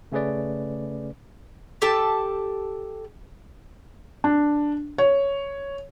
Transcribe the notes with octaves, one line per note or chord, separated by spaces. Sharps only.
C#3 A3 C#4 G#4 B4 D5
G4 A4 G5 A5
D4
C#5